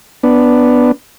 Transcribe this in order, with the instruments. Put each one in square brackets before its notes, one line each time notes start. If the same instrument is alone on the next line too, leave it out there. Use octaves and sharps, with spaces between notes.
[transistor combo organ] B3 D4